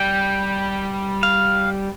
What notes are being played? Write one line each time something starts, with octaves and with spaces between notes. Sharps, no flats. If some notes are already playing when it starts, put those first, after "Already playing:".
Already playing: G3 G5
F5